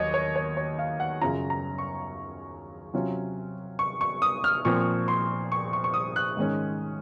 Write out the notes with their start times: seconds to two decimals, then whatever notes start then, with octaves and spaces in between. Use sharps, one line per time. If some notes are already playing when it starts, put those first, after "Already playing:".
Already playing: D#2 D#3 F#3 C#5 D#5
0.14 C#5
0.36 C#5
0.57 C#5
0.79 F5
1.00 F#5
1.21 F#2 C#3 F#3 C#4 F4 A#5
1.50 A#5
1.78 C#6
2.93 C3 F#3 C#4 F4
3.79 C#6
4.01 C#6
4.22 D#6
4.44 F6
4.65 A#2 F3 C4 C#6
5.08 C6
5.52 C#6
5.73 C#6
5.84 C#6
5.94 D#6
6.16 F#6
6.37 G#2 D#3 G#3 C#4